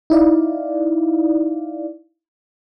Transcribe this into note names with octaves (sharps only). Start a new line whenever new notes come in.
D#4 E4 D5 F5